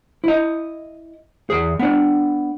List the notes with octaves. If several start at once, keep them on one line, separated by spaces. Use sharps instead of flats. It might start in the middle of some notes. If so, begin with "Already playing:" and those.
E4 D#5
E2 G#4
B3 D4